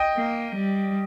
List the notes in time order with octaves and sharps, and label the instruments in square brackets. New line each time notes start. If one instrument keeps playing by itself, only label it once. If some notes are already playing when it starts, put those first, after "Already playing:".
Already playing: [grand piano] D#5 G5
[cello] A#3
G3